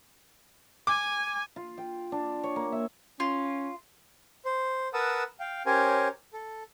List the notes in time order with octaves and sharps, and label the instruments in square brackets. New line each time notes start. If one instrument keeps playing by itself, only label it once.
[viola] G#5 [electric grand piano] D6
[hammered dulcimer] F4
G5
D4
C#5
A#3
E5
[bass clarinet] C#4 [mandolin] F4
[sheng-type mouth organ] C5
A#4 B4 F#5 A5 D#6 E6
F5 G5
C#4 G4 A#4 C5 C#5 G#5
A4